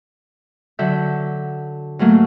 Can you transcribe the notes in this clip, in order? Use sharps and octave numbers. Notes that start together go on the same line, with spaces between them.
D3 F#3 E5 G6
G#2 F#3 A3 A#3